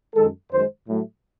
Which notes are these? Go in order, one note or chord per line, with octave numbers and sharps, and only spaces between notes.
F#2 D#3 G#3 A4
F#2 D#3 G#3 C5
A2 F#3 A3